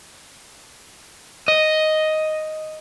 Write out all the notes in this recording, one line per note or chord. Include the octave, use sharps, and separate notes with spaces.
D#5